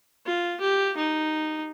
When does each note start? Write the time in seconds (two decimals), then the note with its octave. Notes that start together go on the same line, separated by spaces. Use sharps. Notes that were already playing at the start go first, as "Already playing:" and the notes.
0.26 F4
0.61 G4
0.97 D#4